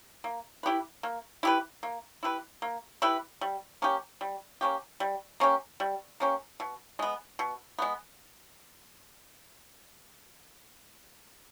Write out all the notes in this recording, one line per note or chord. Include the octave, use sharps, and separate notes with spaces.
A#3
E4 G4 B4
A#3
E4 G4 B4
A#3
E4 G4 B4
A#3
E4 G4 B4
G3
A#3 C#4 G4
G3
A#3 C#4 G4
G3
A#3 C#4 G4
G3
A#3 C#4 G4
B2
G#3 B3
B2
G#3 B3